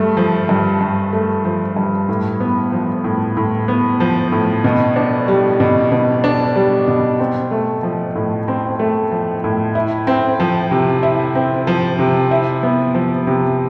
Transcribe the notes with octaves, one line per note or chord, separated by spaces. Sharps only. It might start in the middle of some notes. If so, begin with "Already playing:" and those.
Already playing: G2 A3
F3
G2
G2
A3
F3
G2
A2
B3
F3
A2
A2
B3
F3
A2
B2
D4
G3
B2
B2
D4
G3
B2
C4
A3
F3
A2
C4
A3
F3
A2
E4
C4
F3
C3
E4
C4
F3
C3
E4
B3
F3
C3